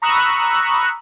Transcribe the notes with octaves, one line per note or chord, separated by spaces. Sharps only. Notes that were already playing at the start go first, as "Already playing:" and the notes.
A#5 B5 C#6 D#6 E6 F#6